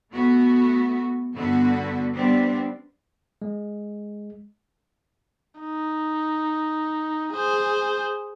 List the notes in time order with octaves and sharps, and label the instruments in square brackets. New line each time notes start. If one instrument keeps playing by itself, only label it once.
[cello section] A3 B3 F#4
G2 D3 B3 F#4 B4
G3 B3 C4 D4
[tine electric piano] G#3
[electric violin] D#4
G#4 C5